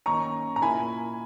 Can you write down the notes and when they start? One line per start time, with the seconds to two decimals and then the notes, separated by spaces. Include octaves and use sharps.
0.06 F#2 D#3 A#3 C#4 A#5 C#6
0.56 A#5
0.62 A#2 A#3 E4 G#5 B5